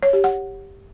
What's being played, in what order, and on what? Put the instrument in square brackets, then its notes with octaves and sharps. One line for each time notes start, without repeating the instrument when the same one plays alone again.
[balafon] C#5
G4
F#5